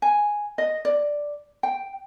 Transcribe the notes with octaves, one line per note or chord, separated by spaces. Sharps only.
G#5
D#5
D5
G5